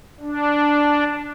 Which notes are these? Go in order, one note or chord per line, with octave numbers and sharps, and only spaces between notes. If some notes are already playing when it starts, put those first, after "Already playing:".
D4